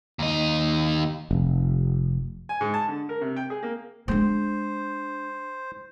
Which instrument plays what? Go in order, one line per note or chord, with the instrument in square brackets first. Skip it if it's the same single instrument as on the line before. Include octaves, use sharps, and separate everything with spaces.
[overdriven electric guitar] D#2 D#4
[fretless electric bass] F1
[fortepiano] G#5
G#2
A5
D3
A#4
C3
G5
G#4
A#3
[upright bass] G#3 D4 [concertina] C5